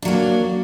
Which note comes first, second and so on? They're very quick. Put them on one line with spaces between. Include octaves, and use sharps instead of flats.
D4 F#3 A#3